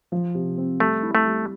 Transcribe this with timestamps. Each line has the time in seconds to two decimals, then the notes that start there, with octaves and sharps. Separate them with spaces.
0.12 F3
0.35 C3
0.58 C4
0.80 G3 A3
1.03 E4
1.15 A3
1.26 G3